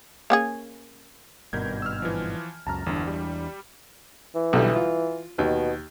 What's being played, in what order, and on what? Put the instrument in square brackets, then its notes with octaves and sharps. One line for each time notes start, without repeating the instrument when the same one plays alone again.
[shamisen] A#3 C#4 G#4
[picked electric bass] G#1 G2 B2 [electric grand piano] A#4 G6 G#6
[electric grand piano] E6 F6
E3 F3
[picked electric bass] C#2 F#2 [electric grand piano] A5 A#5 F6
[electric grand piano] G1 [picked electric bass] E2 D4
[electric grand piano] G3
[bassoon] E3
[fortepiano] B1 D3 G3
F4
[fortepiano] D#2 [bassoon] B2